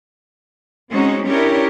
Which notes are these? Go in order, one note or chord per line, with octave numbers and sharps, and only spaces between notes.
G#3 C4 C#4 D#4 F#4
C#4 D4 E4 G4 A#4 C#5